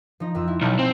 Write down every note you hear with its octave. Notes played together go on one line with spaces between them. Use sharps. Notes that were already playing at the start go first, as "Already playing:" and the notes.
F3 D#4
F2 F3 E6
E4
B1 G#5 A5 G6
C4